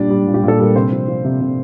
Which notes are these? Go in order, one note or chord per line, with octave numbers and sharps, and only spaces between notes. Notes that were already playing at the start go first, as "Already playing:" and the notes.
Already playing: A#2 G3 D4 D5
G3
A#2
G4
A#2
A4
G3 A#4
C3 C4 C5
F3
F3
C3
C3